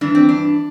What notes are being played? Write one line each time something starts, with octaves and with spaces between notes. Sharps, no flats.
G2 E3 D4
C4
D4